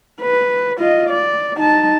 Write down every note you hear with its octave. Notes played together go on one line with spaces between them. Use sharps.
B4
F4 D#5
D5
D#4 A5